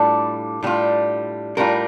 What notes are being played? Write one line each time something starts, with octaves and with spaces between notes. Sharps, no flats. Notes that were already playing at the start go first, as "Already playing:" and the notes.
Already playing: A2 G3 D4 F4 A4
A2 G3 D4 F4
A2 G3 D4 F4 A#4